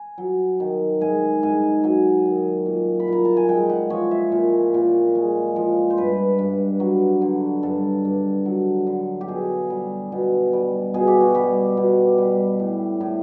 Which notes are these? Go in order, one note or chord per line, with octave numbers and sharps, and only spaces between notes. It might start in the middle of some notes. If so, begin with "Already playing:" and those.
Already playing: G#5
F#3
D#3
G#2 G#5
G#2 G#5
F#3 G#5
D#3
A#2
B5
A#2 A#5
A5
G#5
G#3 G5
F#5
F3 C#5
E5
A#2
A#2
G#3
F3
C5
G2 B4
G2
F#3
D3
G2 A4
G2
F#3
D3
G4
B2 G#4
G3
B2
G3
B2 G#4
G4
F#4
G3 G4
B2
G3
A2
A2